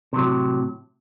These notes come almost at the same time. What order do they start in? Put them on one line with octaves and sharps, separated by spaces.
C3 F#3 A2